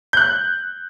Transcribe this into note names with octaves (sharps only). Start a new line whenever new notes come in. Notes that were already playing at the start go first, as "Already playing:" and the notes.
F#6 G6